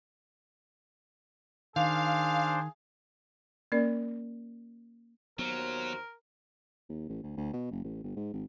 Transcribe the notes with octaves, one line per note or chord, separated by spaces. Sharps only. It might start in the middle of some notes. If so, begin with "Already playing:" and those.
D#3 D4 G#4 C5 F5
A#3 C#4 A#4 D5
D#2 F#3 B3 A#4 C5
D#2
A1
D2
D2
B2
F#1
A1
G1
G#2
G#1